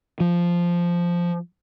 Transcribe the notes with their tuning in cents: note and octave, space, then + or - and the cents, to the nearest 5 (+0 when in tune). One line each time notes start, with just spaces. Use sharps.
F3 -5